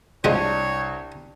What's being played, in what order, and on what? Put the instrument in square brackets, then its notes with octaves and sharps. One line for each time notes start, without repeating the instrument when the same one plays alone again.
[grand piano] C2 [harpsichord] F3 G#3 F#4 [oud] D4 [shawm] C#5